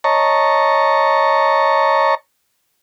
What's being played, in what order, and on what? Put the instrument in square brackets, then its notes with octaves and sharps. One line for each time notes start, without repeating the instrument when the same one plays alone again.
[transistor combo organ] C#5 D#5 A5 A#5 C#6